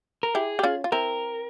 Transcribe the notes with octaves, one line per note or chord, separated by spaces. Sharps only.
A#4
E4 G4 G#4
G4
C#4 F4
F4
C4 E4 A#4